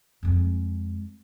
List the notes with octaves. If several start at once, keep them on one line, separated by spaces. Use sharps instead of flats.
F2 G#3